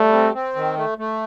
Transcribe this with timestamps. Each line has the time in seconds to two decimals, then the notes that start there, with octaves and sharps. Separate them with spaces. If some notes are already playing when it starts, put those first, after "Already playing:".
Already playing: G3 A3
0.13 C4
0.34 C4
0.56 D#3
0.77 A3
0.98 A3